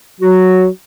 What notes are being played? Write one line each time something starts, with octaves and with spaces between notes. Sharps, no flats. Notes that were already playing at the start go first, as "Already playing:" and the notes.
F#3 F#4